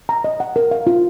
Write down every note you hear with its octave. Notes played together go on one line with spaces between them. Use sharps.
A#5
D#5
F#5
A#4
F5
F4